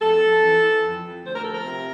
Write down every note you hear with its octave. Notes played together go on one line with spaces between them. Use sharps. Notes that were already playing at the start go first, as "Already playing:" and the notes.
F2 A4
F2
E3
E3
F2
F2
D2 C5
A#4
F3 A4
A#4
C3